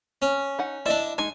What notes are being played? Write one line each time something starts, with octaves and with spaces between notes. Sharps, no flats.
C#4
D#4 F#5
D4 E4 D5 D#5
G#3 D#4 G#5